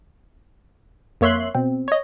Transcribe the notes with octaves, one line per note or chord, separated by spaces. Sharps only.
F2 A#3 C#5 E5 C6 F#6
B2 C4
C#5 D#5